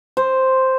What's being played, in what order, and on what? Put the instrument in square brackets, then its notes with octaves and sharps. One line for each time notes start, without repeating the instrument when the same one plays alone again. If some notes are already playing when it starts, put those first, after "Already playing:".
[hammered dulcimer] C5